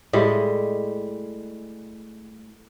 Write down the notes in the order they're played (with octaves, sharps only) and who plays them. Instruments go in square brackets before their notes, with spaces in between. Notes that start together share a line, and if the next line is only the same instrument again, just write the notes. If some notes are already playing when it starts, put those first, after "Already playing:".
[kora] A2 G3 G#3 D#5